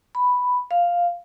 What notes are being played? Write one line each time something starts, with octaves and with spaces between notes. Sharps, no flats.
B5
F5